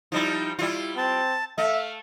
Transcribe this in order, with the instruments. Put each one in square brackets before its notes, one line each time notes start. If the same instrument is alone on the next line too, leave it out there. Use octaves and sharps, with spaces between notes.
[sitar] F3 G3 E4 [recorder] D#4
[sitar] G3 F4 [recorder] E4
[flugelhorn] C4 [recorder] A5
[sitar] A3 [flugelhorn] E5 [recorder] F5